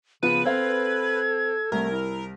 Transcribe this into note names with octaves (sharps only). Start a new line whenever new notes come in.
C#3 F3 B3 B4 D#7
C4 A4 F5 G#6
C2 A3 A#4
E4